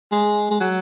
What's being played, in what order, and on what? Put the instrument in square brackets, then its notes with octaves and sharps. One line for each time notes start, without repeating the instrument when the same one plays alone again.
[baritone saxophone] G#3
G#3
F#3